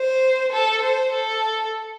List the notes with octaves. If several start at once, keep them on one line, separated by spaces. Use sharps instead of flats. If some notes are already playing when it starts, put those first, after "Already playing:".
Already playing: C5
A4
C5
A4